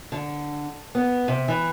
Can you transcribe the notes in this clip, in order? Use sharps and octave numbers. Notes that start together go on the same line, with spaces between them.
D3
B3
C3
E3